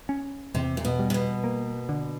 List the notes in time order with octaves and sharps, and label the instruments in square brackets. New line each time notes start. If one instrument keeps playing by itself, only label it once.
[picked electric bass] C#4
[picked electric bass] E2 [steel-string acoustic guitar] C3
[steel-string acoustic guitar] A#2
B2
[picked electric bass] G3
[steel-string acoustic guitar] C3
B2
[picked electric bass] A#3
D3